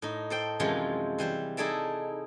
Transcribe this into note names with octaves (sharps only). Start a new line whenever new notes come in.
A2 D#4
A4 C5 G5
F#2 C3 E3 F3 G#3 F4
E3 G3 C5
D#4 E4 G#4 A4 D5 E5